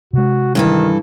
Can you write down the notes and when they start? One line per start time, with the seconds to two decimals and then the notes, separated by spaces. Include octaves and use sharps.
0.13 C3 G#3 F#4
0.55 G2 D#3 E3 A4